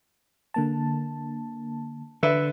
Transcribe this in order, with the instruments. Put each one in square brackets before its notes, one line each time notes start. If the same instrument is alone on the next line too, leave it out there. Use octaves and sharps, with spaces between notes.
[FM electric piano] D3 A#3 A5
[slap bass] D3 [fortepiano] B4 E5